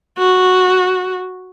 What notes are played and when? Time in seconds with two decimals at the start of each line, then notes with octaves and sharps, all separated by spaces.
0.18 F#4